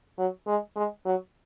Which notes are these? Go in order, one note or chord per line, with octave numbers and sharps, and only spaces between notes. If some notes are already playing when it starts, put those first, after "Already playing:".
F#3
G#3
G#3
F#3